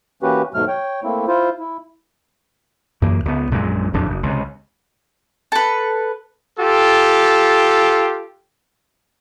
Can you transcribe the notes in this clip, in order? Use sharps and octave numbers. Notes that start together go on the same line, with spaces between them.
E3 A#3 C#4 F#4 G4 B4
D#2 G#2 B2 F#3 A3 F6
C#5 G5
A3 A#3 C4 E4
E4 F4 C5
E4
F#2 E3 A#3
C#2 B3
A#1 F#2 A#2 G#3
D1 F2 D4
F#1
C#2 C3
A4 B4
F4 G4 A4